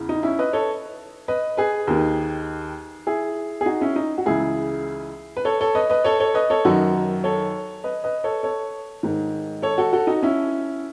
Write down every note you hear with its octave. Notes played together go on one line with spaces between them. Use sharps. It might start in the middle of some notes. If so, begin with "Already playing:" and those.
Already playing: E2 C#3 E3
D#4
C#4 E4
B4 D#5
A4 C#5
B4 D#5
G#4 B4
D#2 D#3
E4 G#4
G#4
D#4 F#4
C#4 E4
D#4
F#4
C#2 C#3 E3 E4 G#4
B4
A4 C#5
A4 C#5
B4 D#5
B4 D#5
A4 C#5
A4 C#5
B4 D#5
A4 C#5
F#2 D#3 D#4 F#4
A4 C#5
B4 D#5
B4 D#5
A4 C#5
A4 C#5
G#2 D#3
A4 C#5
F#4 A4
F#4 A4
D#4 F#4
C#4 E4